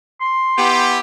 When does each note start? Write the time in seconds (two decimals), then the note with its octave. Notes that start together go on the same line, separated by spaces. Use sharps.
0.21 C6
0.59 B3 E4 G4